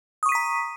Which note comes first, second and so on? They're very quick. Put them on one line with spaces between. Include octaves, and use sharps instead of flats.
D#6 C#6 D#7 B6 A#5